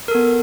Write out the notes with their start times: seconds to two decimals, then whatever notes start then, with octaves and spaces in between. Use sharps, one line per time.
0.08 A#4
0.11 A4
0.15 B3